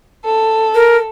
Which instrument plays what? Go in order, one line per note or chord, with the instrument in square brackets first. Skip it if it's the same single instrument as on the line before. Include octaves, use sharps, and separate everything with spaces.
[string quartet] A4
[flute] A#4